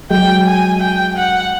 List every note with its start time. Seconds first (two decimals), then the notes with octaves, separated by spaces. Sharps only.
0.10 F#3 G#3 G5
0.46 G#5
0.81 G5
1.17 F#5